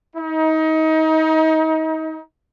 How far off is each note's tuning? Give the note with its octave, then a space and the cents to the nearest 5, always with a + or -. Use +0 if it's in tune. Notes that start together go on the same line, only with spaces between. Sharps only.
D#4 +30